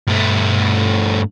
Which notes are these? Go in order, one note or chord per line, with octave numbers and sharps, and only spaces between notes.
G2 A3